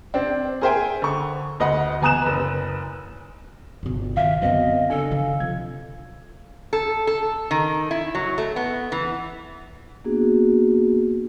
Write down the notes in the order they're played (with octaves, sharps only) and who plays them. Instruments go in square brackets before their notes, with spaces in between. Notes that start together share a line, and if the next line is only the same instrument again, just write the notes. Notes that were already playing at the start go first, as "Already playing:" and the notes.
[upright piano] C4 D4
G#4 A#4 C5 E5 G5 G#5
D3 C#6
D2 D#5 F#5 B5
E2 G#5 A#5 D#6 F#6 E7
F#1 B4
[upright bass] G1 B2
[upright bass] D#3 [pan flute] E5 [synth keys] F5
[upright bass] F#2 D3 [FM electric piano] F#3 B3 C4 [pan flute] D#5
[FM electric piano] C#3 D4 G#5 [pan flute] A4
[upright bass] D3
[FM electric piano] C3 G#6 [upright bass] F3
[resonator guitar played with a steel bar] A4
A4
D#3
E4
F#3
A3
B3
E3
[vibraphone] A#3 B3 D4 F#4 G#4